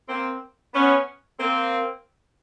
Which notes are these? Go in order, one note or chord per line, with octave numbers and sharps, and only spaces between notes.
A#3 C4
B3 C#4
A#3 C4